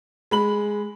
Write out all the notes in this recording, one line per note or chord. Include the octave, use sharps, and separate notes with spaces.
G#3 B5 F#7